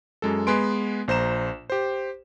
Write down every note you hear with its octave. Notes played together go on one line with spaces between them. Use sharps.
F#2 G#3 A4
G#3 B3 B4 G#5 C6 D7
A#1 C5 A#5 E7
G4 C5